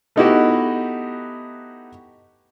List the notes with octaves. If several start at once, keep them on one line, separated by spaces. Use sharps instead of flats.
A3 B3 D#4 E4 F#4 G4